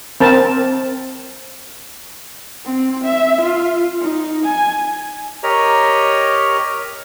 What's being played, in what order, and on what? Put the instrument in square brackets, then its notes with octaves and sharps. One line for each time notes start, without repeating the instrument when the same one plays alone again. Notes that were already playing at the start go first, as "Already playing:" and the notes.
[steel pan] C4 A#4 A5
[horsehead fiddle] C4
E5
F4
D#4
G#5
[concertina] G4 A#4 C#5 D#5 A#5